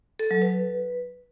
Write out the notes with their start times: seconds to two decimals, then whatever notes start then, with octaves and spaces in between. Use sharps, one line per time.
0.19 A4
0.31 F#3
0.42 B4